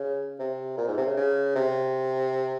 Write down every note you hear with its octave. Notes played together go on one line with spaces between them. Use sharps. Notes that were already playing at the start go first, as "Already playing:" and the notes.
Already playing: C#3
C3
A#2
G#2
C3
C#3
C#3
C3